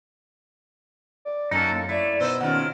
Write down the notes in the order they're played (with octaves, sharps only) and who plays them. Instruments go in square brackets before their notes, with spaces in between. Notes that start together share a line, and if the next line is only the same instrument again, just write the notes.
[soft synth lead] D5
[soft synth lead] F#2 [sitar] F#3 A#3 C#4 [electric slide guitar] D#4 A4
[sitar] A2 [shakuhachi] A#3
[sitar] A3 [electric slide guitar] E4 [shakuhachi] D5
[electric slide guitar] B2 [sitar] D#4 B4 C5 [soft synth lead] E6
[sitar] D#2 D#3 F4 [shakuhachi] C#4 [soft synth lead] F#5